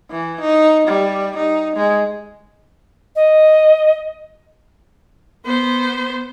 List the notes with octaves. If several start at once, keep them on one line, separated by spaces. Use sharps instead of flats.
E3
D#4
G3
D#4
G#3
D#5
B3 C5